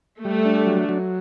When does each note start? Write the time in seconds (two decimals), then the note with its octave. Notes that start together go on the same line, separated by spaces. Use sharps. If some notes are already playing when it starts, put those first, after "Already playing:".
0.24 G3 A3
0.45 D4
0.66 F#3
0.89 F#3